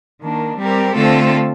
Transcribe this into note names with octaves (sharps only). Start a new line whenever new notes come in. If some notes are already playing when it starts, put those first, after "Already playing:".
D#3 A#3 D4
G3 C4 G4 A#4
D3 A3 C4 F4 A4